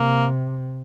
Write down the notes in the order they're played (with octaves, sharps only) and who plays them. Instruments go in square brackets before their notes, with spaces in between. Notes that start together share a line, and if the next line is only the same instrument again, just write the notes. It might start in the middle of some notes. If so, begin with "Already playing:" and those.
Already playing: [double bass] C3 [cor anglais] A#3